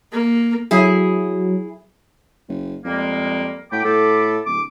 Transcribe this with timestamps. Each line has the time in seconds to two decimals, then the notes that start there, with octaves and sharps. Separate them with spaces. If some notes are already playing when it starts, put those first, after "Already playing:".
0.12 A#3
0.71 F#3 E4 G#4
2.49 F#1
2.85 F2 G3 G#3 A#3
3.72 A2 F#4 G5 B5 D6
3.85 A2 A4
4.46 D1 D6